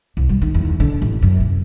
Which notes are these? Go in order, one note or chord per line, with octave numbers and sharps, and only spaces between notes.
C2
G3
D#3
E2
D3
A1
F#2
C3